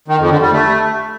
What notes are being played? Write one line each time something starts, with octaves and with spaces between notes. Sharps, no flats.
D#3
F2
D3
G3
A3